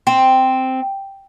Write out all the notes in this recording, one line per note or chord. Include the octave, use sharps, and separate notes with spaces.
C4